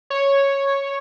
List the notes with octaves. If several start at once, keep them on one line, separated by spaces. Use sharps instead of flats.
C#5